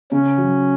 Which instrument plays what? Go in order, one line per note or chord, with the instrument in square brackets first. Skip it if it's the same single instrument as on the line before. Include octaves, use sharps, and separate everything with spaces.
[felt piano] C#3 [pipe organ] C#4
[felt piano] F#3